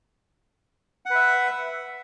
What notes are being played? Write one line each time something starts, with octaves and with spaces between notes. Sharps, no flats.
B4 E5 F#5